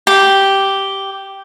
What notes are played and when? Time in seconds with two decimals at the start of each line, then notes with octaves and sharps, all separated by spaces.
0.07 G4